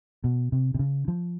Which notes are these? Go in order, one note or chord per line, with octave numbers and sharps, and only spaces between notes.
B2
C3
C3
C#3
F3